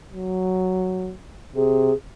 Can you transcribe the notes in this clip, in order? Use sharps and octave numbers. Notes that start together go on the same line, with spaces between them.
F#3
C3 G#4